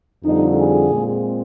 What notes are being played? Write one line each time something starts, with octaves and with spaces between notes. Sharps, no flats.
F2 D3 G3 D#4
G#4
A#2 G#3 C4